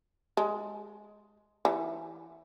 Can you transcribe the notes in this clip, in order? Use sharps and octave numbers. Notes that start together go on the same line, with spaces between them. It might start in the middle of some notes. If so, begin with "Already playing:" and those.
G#3
E3